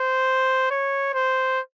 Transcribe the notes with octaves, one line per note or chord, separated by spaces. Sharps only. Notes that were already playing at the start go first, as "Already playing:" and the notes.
Already playing: C5
C#5
C5